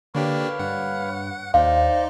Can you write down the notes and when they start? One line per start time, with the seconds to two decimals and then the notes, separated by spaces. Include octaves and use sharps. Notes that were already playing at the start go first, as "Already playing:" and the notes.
0.15 D3 A#3 D4 G4 B4 C#5 F5
0.59 G2 F#5
1.54 D#2 D#4 C5 D5 F5